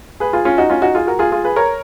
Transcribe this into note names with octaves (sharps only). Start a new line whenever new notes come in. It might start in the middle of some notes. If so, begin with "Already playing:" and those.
G#4 B4
F4 G#4
C#4 F4
D#4 F#4
C#4 F4
D#4 F#4
F4 G#4
F#4 A#4
F4 G#4
F4 G#4
G#4 B4
A#4 C#5